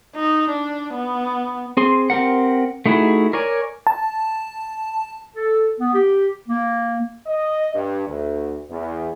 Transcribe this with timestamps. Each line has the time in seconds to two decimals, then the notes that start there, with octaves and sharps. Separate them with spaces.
0.15 D#4
0.50 D4
0.94 B3
1.77 C4 G#4 C6
2.10 C4 G4 A#4 F#5
2.86 A3 D#4 E4 F#4 G#4
3.33 A#4 C#5 D5 G#5
3.87 A5
5.35 A4
5.79 B3
5.94 G4
6.48 A#3
7.27 D#5
7.74 G2
8.08 D2
8.70 E2